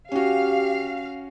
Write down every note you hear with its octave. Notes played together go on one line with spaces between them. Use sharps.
C#4 F#4 G4 F5